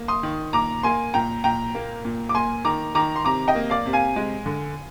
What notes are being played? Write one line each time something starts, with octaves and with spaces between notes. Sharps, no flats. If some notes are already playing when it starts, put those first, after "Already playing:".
Already playing: A#3
C6 D#6
D#3
A#2 A#5 D6
A#3 G#5 C6
A#2 G5 A#5
A#2 G5 A#5
A#3
A#2
D6
A#3 G#5 C6
D#3 A#5 D6
D#3 A#5 D6
C6
C3 A#5 D6
D#5 G5
A#3
D5 F5
C3
F5 G#5
G#3
D3